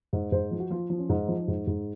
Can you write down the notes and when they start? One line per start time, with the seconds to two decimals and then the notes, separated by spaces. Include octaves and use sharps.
0.13 G#2
0.32 G#2 C5
0.51 F3
0.60 F#4
0.70 F3 F4
0.90 F3
0.98 C#4
1.09 G#2 D#4
1.28 F3
1.48 G#2
1.67 G#2